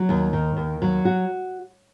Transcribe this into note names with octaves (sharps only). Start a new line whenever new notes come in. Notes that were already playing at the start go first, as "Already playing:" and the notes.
Already playing: F#3
D#2
D#3
D#2
F#3
F#4